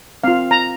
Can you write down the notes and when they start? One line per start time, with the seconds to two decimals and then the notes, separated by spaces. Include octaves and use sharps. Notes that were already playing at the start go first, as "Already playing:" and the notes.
0.24 C4 F4 F5
0.51 A#5